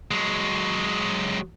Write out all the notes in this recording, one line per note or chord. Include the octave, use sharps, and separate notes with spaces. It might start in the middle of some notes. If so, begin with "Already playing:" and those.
F#3 G#3